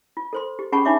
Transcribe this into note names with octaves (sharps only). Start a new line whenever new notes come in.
F4
A4 C5 C6
G4
C#4 G#4 F#5 A5 B5 C#6
D4 D#4 F4 C#5 E5 D6